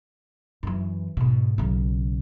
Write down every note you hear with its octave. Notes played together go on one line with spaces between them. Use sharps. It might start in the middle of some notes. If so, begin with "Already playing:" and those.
F#2 E3
G#2 B2
B1 C#3